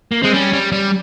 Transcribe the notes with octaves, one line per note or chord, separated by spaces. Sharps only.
A#3
G#3 C4
G3 C#4
G3
G3